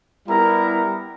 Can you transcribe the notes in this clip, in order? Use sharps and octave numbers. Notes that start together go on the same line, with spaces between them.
G3 B3 E4 A#4 A#5